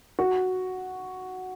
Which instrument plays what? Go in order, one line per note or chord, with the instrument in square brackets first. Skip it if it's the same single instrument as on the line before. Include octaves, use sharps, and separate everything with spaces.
[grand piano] F#4